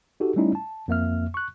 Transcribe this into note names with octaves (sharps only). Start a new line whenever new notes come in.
D#4 F#4 G4 A4
G3 A3 C#4 D#4 E4
A5
F2 A#3 E5 F6
C#6 F#6